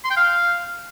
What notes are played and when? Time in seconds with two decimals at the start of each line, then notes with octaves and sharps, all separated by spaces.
0.04 C6
0.11 G5
0.17 F5